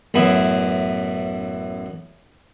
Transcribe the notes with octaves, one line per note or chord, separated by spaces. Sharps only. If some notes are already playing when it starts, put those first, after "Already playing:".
A1 F#2 B3 E4